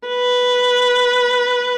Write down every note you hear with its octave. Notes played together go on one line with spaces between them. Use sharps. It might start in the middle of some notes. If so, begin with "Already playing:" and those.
B4